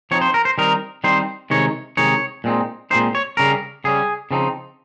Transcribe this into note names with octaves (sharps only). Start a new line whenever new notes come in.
F3 C4 D#4 C#5
C5
A#4
C5
D#3 G3 C4 D#4 A#4
D#3 G3 C4 D#4 C5
C3 D#3 G#3 D#4 C#5
C3 D#3 G#3 D#4 C#5
A#2 G#3 C4 D#4
A#2 G#3 C4 D#4 C5
C#5
C#3 G3 C#4 A#4
C#3 G3 C#4 G#4
C#3 F3 C4 D#4